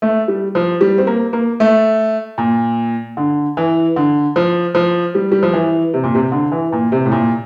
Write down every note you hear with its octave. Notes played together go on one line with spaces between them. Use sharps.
A3
G3
F3
G3
C4
A#3
A#3
A3
A#2
D3
E3
D3
F3
F3
G3
G3
F3
E3
C3
A#2
C3
D3
E3
A#2
C3
A2
A#2